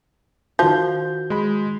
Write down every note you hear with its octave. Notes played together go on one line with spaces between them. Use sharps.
D#3 F3 F#4 G6
G#3 B5